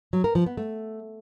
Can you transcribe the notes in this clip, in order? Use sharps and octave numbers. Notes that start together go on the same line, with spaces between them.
F#3
A#4
F3
B3
A3